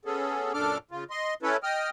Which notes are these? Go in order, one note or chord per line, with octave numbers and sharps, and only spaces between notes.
B3 C#4 G#4 A4
F#2 A#2 D4 A4 D6 F6
C#3 F4
D#5 C6
C#4 E4 A4 B4 C#5
D#5 G5 D#6 F6